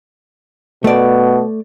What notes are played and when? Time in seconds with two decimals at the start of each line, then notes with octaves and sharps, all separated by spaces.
0.84 B2 A3 D5